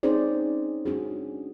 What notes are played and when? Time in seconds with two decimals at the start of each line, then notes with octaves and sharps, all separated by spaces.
0.03 C4 C#4 D#4 G#4 C5 D5
0.86 C#4 D4 F#4 G#4